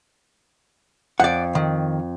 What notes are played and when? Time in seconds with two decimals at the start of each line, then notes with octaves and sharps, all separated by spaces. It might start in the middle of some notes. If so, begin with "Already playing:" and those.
1.20 F2 D5 F#5
1.55 D#3